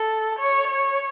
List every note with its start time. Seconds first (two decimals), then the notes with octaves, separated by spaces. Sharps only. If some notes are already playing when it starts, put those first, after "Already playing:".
Already playing: A4
0.39 C#5
0.67 C#5